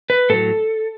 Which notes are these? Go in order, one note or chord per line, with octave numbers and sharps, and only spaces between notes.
B4
A2 F#3 A4